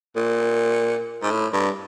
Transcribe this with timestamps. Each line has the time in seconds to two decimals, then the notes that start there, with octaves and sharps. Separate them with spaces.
0.16 A#2
1.22 G#2
1.31 A2
1.53 G2